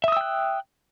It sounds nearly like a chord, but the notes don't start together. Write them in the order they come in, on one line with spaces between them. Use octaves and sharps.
E5 D#6 E6 G5 F#6